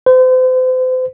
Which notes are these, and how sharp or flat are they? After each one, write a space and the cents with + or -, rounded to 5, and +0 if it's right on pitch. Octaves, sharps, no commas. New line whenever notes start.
C5 -40